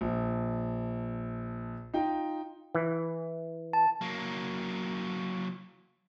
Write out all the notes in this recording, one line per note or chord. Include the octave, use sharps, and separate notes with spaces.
A#1
D#4 F4 G5
E3
A5
F#3 A#3